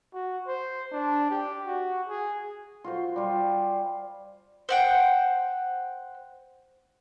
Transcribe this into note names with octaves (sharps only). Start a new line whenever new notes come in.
F#4
C5
D4
G4
F#4
G#4
F4 F#4 C5
G3 F4 G#5
C5 F#5 G5